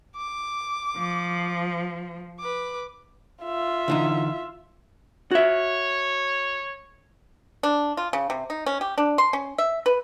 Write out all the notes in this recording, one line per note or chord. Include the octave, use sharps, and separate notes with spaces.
D6
F3
B4 D6
F4 E5
D3 E3 D#4
F#4 C#5 E5
D4
F4
C#3
C3
D#4
C#4
G4
D4
C6
C#4
E5
B4